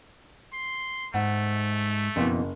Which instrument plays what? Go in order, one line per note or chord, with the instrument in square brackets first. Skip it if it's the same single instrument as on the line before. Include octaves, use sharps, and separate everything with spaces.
[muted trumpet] C6
[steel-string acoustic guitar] G#2 [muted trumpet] A3 [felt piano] F#5
[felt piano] F#1 [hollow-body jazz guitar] F2 B2 E3